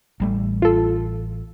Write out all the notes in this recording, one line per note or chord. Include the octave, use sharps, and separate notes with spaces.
A1 G3 A3
F4 A4